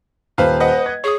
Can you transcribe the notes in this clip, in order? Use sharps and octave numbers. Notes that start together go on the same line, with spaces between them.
D#1 B4 C5 F5
B4 D#5 F#5
G#6
G#4 C#5 D#6